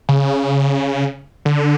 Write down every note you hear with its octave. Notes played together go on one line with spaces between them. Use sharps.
C#3
D3